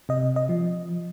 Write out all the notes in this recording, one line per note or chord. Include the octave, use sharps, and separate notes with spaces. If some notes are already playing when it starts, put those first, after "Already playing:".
C3 D#5
D#5
F3